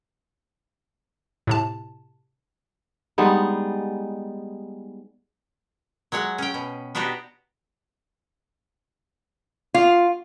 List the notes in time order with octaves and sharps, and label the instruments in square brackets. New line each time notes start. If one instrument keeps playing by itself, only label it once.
[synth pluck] A2 C3 A5
[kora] G3 G#3 B3 D#4
[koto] F#3 G#3 C#5 F#5
C#4 G5
B2
B3 D4 D#4 F#4 G4
[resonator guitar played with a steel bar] F4